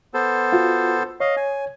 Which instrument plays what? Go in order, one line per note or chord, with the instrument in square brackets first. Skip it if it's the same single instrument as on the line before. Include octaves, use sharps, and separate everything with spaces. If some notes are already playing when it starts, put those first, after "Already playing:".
[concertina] B3 A4 C5
[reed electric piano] F4 F#4
[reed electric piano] C#5 [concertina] D#5 F5
[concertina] G#5